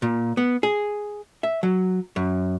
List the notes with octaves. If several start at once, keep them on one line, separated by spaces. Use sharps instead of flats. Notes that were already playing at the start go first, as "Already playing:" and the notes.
A#2
B3
G#4
E5
F#3
F#2